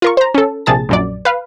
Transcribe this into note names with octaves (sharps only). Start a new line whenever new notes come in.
F4 A#4 C#6
C5 A#5
C#4 A4
A#1 C3 G#4 A5 A6
A#1 F#2 D5
B4 F5